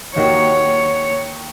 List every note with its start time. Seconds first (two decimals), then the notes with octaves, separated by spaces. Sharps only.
0.16 D#2 D#3 A#3 D#4 F#4 C#5